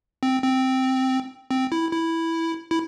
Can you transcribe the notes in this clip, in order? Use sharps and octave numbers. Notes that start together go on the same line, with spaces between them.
C4
C4
C4
E4
E4
E4